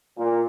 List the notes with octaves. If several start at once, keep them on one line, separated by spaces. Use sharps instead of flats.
A#2